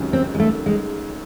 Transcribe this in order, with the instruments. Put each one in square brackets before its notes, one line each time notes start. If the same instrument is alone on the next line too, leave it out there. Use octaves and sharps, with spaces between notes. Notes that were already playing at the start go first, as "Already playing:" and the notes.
Already playing: [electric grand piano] C#2 C3 D#3 F#3 C#4
[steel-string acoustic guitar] C4
G#3
A3
G#3